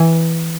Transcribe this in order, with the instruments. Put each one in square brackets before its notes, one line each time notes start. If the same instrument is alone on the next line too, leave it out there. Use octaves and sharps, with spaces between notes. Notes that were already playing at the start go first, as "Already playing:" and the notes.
Already playing: [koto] E3